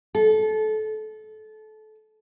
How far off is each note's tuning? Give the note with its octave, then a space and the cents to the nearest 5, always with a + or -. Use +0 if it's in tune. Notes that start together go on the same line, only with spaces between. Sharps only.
A4 -25